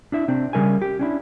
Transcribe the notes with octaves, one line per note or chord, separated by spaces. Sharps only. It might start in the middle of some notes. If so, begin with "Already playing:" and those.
D4 E4 E5
C3 C4 D4
C#3 G3 A#4 E5 G#5
G4
C#4 D4 E4